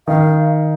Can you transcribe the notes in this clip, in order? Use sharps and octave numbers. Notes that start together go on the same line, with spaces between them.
D#3 F5